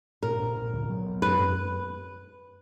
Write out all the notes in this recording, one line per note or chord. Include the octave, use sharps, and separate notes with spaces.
A#2 A#4
D4
A#2
D2
F#3
B3
F#2 B4